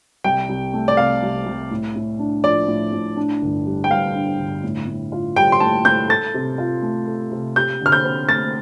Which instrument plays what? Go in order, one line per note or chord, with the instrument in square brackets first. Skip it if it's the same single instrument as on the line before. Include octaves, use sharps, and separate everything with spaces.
[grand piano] C2 [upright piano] G5
[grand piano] C2
A3
[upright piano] D5
[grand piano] C3 [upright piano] F5
[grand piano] C2
C2
A2
A2
D4
[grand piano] F3 [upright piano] D5
[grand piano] A2
A2
D4
G1
G3
[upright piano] G5
[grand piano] G2 [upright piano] F5
[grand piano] D4
G1
A2
A2
F4
[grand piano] G3 [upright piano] G5
[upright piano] C6
[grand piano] A2 [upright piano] A5
[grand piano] A2 [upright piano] G6
[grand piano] A4 [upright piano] A6
[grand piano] C3
F4
A3
A4
C3
[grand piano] G4 [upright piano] G6
[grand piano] D3
[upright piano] F6
G6
[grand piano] C4
[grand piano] A3 [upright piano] A6